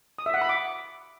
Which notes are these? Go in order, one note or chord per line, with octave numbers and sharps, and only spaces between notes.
D#6
E5
F#5
B5
D6